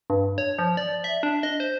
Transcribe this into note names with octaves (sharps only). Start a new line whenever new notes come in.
G2
C#5
F3
D5
E5
D4
D#5
C5